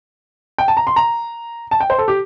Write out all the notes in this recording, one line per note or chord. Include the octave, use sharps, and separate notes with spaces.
G5
A5
A#5
C6
A#5
A5
G5
C5
A4
G4